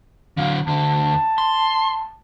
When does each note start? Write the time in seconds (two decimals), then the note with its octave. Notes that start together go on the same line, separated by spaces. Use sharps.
0.37 D3 F#3 F5
0.67 D2 D3 A5
1.38 C6